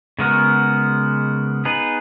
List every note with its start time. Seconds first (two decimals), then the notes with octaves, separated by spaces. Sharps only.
0.19 C#3 G#3 B3 F#4 A#4
1.65 B3 D#4 G#4 B4